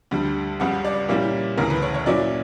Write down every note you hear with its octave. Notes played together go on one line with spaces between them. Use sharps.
D2 D3 G3
C#2 C#3 G3 F#5
D5
A#2 G3 A#3 C#4 E4
D2 C#3 E3 A#4
B4
C#5
C#5
A#2 F#3 C#4 E4 D5